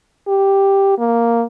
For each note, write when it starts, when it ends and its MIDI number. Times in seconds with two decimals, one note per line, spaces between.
0.28 0.98 67
0.99 1.44 58